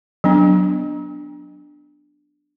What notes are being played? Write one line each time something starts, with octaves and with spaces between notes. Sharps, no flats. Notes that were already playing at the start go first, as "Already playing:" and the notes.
F#3 B3 D4